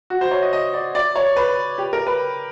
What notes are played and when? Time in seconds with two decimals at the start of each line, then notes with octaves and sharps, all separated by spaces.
0.10 F#4
0.21 C5
0.31 C#5
0.42 D#5
0.53 D#5
0.73 D5
0.95 D5
1.16 C#5
1.36 B4
1.78 G4
1.93 A#4
2.07 B4